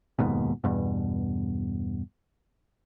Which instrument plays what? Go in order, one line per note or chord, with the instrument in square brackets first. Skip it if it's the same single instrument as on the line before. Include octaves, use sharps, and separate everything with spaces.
[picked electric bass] F1 D#2 G#2 B2
E2 G2 B2